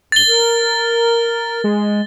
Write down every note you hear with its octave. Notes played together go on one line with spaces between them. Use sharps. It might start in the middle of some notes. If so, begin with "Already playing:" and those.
F#2 A6 G7
A#4
G#3